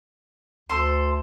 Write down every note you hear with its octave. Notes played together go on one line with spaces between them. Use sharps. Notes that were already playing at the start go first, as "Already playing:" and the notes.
D2 A4 C5 C6